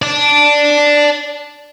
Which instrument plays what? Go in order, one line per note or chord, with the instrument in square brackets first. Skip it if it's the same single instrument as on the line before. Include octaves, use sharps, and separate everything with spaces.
[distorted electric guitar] D5 A5